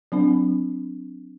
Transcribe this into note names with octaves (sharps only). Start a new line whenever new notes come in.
F#3 C4 D4